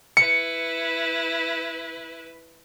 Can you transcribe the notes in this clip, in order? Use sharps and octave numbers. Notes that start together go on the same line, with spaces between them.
E4 B4 C#7